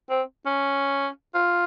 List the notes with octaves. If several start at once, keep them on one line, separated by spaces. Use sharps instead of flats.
C4
C#4
F4